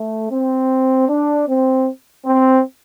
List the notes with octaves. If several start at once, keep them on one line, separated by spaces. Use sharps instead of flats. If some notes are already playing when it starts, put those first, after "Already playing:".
Already playing: A3
C4
D4
C4
C4